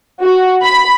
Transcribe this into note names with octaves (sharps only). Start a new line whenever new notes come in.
F#4
B5